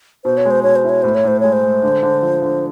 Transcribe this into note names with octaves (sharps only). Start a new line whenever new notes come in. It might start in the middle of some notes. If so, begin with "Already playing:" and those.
B2 C5
C#5
G#3
C5
B2 C#5
C5
E4 C#5
A2 C5
C#5
A2 C5
G#3 C#5
C5
G#3
D3
D3
F3
D3